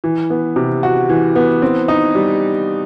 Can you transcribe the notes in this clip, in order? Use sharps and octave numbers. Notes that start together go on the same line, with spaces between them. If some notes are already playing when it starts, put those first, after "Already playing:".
E3
B3
C3
F#4
E3
B3
C4
D#4
G3